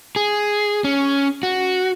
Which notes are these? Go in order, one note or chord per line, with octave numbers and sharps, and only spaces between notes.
G#4
C#4
F#4